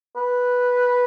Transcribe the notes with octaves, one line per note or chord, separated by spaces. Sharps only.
B4